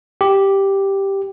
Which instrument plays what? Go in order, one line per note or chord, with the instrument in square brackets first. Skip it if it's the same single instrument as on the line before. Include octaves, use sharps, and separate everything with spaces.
[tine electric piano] G4